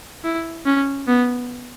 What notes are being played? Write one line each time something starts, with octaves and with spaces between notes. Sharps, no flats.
E4
C#4
B3